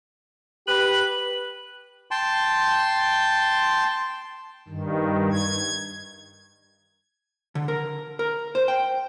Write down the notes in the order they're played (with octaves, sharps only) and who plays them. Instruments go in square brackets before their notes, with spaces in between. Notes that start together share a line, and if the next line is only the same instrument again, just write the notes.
[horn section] G4 B4 [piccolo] F#7
[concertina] G5 A5 C6
[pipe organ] G2 D#3
G#6
[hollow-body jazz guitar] D3
A#4
A#4
C5
G5